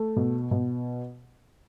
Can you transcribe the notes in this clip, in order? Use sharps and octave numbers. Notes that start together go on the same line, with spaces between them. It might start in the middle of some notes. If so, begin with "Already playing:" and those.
Already playing: A3
B2
B2